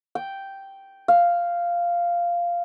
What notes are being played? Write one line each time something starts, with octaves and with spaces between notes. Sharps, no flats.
G5
F5